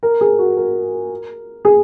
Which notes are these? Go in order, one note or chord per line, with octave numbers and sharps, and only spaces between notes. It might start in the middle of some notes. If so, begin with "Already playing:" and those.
A#4
G#4
F#4
A#4
G#4